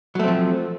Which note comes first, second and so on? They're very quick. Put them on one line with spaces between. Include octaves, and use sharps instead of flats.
F#3 A3 C4 F3